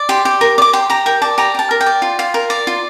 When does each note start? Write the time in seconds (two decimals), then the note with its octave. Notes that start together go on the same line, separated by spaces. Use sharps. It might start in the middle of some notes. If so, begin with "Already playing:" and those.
Already playing: D5
0.09 G4 C6
0.25 G4
0.41 A#4
0.58 D5
0.62 D6
0.73 G4 C6
0.90 G4 A#5
1.06 A#4 G5
1.22 D5 A5
1.38 G4 A#5
1.55 G4 A5
1.71 A#4
1.81 G5
1.86 D5
2.02 F4
2.19 F4
2.34 A#4
2.50 D5
2.67 F4